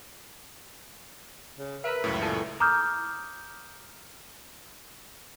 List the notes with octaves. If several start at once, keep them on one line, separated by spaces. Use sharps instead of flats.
C#3
A#4 B4 E5
C#2 F#2 A2
A#2 E4 A4 G#5
A#5 D6 D#6 F6 G6